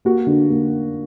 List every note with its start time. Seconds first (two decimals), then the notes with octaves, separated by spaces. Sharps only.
0.05 A#3 F#4
0.27 D3
0.49 A#3